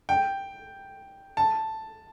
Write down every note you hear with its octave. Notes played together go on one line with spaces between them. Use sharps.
G5
A5